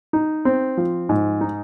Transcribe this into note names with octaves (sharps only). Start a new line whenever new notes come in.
D#4
C4
F3
G#2
D#4